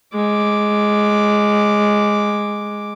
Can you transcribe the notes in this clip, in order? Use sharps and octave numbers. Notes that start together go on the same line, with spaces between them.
G#3 D6